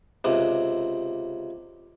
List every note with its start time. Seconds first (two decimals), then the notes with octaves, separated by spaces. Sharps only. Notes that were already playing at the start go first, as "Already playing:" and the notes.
0.24 C#2 C3